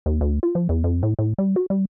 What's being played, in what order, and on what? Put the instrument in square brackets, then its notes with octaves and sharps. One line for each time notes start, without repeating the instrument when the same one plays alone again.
[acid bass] D#2
D2
F4
F3
E2
F2
A2
A2
G3
F#4
G3